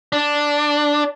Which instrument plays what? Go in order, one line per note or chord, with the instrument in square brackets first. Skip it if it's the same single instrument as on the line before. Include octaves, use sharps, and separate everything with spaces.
[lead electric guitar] D4